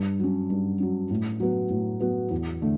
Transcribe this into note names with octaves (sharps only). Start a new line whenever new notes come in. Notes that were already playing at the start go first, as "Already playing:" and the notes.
Already playing: G2
F#3 C#4
G2
F#3 C#4
A2
F#3 B3 F#4
A2
F#3 B3 F#4
E2
D3 A3